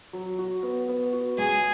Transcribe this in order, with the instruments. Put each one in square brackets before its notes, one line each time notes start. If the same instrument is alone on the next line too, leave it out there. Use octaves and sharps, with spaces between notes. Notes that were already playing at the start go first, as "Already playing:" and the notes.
[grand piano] F#3
F#4
B3
B3
F#4
[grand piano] C#2 [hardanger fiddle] G#4